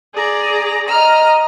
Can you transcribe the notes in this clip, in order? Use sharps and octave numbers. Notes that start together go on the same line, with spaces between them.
G#4 D5 A#5
D#5 A#5 F6